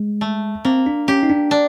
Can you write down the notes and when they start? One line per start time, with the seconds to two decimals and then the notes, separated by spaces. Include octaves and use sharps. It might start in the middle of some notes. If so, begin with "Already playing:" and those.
Already playing: G#3
0.21 A3
0.65 A#3 C4
0.86 D4
1.08 C#4 G4
1.23 D#4
1.30 D4
1.51 D4